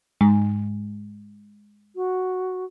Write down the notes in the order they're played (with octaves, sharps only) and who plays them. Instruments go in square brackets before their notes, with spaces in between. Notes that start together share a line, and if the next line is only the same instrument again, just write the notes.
[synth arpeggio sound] G#2 [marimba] G#3
[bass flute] F#4